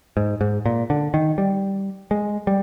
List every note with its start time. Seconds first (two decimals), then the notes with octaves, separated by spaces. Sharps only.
0.17 G#2
0.41 G#2
0.66 A#2
0.90 D3
1.14 D#3
1.38 G3
2.11 G#3
2.47 G3